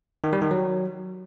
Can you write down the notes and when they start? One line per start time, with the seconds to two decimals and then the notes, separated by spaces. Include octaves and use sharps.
0.24 D#3
0.33 G3
0.42 D#3
0.51 F#3